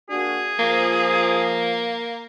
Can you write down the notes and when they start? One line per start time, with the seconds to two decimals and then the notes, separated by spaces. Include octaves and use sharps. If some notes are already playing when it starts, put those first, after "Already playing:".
0.10 A#3 D4 F#4 G#4
0.59 F3 A#3